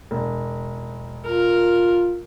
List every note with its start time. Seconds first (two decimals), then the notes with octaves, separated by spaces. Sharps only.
0.11 E1
1.25 F4 A#4